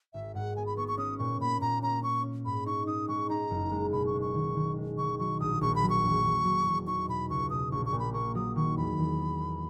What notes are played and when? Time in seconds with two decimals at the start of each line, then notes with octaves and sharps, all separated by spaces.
0.13 G#1 E5
0.35 G#2 F#5
0.56 B3 G#5
0.66 B5
0.77 B3 C#6
0.88 C#6
0.98 C#4 D#6
1.18 A#2 C#6
1.41 A#2 B5
1.61 A#2 A#5
1.83 C#4 A#5
2.03 C#4 C#6
2.24 C#4
2.45 G#2 B5
2.66 D#4 C#6
2.87 D#4 D#6
3.08 G#3 C#6
3.29 D#4 A#5
3.51 F#1
3.71 G#3
3.92 B2 B5
4.06 C#6
4.14 G#3
4.21 C#6
4.34 D#3
4.56 D#3
4.77 G#3
4.98 D#3 C#6
5.19 F#3 C#6
5.40 A#1 D#6
5.61 A#1 C#6
5.75 B5
5.83 F#3
5.90 C#6
6.04 E1
6.24 E1
6.45 F#3
6.66 E2
6.87 D#4 C#6
7.08 B2 B5
7.30 C#2 C#6
7.50 B2 D#6
7.72 A#1 C#6
7.86 C#6
7.92 A#2
7.99 B5
8.13 A#3 C#6
8.35 F#3 D#6
8.56 D#3 C#6
8.77 E2 B5
8.98 E2
9.18 B3
9.40 A#3